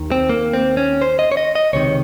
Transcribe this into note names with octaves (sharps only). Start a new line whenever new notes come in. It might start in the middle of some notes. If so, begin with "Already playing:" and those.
Already playing: D#2 D#3
C4
A#3
C4
C#4
C5
D#5
C#5
D#5
D#5
C#2 C3 D#3 C#5